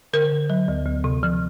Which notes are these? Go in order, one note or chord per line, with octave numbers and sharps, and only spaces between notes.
D3 A#4
D3
F#3
D2
D2
C3
F3